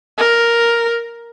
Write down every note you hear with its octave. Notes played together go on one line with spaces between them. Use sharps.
A#4